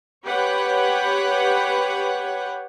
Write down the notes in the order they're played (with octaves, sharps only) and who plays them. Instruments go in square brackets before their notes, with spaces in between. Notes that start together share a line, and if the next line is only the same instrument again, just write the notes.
[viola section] G4 B4 C#5 F#5 G5